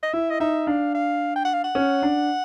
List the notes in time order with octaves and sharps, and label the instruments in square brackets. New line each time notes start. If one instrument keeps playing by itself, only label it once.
[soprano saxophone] D#5
[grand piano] E4 [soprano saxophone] E5
[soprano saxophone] D#5
[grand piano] D#4 [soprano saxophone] E5
[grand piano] D4 [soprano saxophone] F5
[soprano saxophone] F5
G5
F#5
F5
F#5
[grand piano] C#4
D4